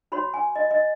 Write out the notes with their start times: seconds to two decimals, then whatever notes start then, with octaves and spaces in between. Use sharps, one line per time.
0.12 F#4 C#5 B5
0.34 G#5
0.56 D#5
0.71 D#5